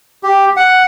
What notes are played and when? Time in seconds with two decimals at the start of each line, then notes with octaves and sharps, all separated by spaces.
0.23 G4
0.57 F#5